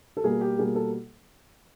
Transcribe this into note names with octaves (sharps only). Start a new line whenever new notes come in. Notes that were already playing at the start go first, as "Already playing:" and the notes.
A4
B2 G3 A#3 G#4
G4
B2 G3 A#3 G#4
A4